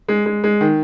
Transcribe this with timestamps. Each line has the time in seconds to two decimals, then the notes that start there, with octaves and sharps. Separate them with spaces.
0.08 G#3
0.26 G#3
0.44 G#3
0.61 D#3